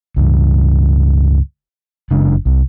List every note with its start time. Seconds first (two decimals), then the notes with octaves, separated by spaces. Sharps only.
0.16 C#2 G2
2.11 F#1 C#3 G#3 D4
2.45 C2